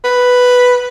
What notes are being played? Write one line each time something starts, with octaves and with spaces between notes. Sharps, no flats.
B4